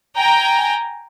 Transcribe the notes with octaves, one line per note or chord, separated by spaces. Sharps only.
G5 G#5 A#5